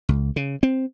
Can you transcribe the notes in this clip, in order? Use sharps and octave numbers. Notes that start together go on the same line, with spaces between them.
C#2
C#3
C4